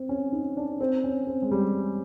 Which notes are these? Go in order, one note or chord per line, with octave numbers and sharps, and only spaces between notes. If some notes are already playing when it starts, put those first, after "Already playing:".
Already playing: C4
C#4
D#4
D4
C4
C#4
C4
G#3
G3